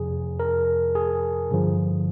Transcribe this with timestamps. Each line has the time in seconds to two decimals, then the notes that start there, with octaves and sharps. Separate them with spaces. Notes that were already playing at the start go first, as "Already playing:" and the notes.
Already playing: F2 C3 F3 G#4
0.40 A#4
0.95 G#4
1.51 G2 D3 F3